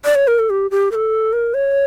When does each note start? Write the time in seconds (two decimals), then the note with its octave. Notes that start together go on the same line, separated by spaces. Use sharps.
0.05 D5
0.15 C#5
0.27 A#4
0.39 A4
0.50 G4
0.71 G4
0.91 A#4
0.95 A4
1.33 A#4
1.54 C#5